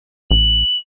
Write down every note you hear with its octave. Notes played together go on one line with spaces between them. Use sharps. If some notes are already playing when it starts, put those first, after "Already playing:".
A1 F#7